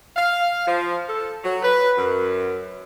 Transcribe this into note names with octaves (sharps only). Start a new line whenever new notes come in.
F5
F3
A4
F#3
B4
F#2